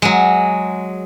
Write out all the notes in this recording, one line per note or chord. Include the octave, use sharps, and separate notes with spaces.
F#3 G#3